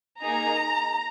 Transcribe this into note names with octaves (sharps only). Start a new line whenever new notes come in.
A#3 D#4 G#4 A#5